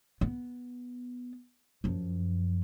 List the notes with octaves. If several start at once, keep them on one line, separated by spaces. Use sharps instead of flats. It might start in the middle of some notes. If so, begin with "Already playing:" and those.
B3
F#2 F3